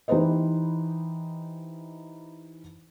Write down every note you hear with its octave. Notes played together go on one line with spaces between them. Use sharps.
E3 D#4 G4 B4 C5 D#5